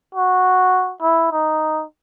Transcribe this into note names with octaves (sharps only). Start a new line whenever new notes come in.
F#4
E4
D#4